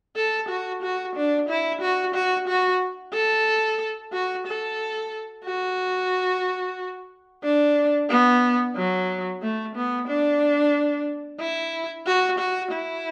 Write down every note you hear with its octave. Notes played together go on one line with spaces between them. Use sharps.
A4
F#4
F#4
D4
E4
F#4
F#4
F#4
A4
F#4
A4
F#4
D4
B3
F#3
A3
B3
D4
E4
F#4
F#4
E4